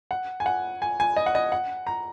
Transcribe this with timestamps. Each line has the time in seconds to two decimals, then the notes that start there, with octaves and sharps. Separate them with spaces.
0.11 F#5
0.40 G#5
0.46 F#5
0.82 G#5
1.00 G#5
1.16 D#5
1.26 F#5
1.35 D#5
1.52 F#5
1.87 A#5